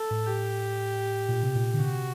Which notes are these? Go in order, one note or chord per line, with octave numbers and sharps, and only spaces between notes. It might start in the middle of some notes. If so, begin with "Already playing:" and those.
Already playing: A4
A2
G4
A#2
C3
A#2
D3
C3 F#4